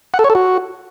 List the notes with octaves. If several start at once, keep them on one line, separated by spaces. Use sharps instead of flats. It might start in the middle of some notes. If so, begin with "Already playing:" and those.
F#5
A4
C#5
A4
F#4